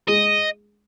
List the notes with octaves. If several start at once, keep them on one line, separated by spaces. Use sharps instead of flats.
G#3 D#5